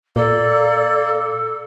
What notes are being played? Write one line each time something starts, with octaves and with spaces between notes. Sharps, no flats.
A#2 A#3 A4 D5